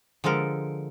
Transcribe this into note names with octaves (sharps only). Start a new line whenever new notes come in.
D3 F3 G#3 A4 A#4